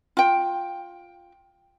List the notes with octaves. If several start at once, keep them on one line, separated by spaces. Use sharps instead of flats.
F4 G5